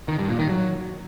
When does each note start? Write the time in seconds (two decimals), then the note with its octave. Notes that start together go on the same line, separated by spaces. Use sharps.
0.08 D#3
0.18 G2
0.29 A#2
0.39 D#3
0.49 F#3